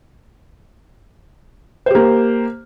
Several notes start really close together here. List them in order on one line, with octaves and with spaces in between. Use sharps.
C5 G4 A#3